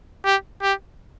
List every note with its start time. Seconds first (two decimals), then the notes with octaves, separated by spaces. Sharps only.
0.25 G4
0.62 G4